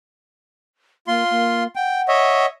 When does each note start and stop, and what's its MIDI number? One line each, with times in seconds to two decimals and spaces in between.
1.08 1.24 58
1.08 1.64 65
1.08 1.64 84
1.31 1.67 58
1.76 2.46 78
1.76 2.02 79
2.08 2.46 73
2.08 2.46 75
2.08 2.46 76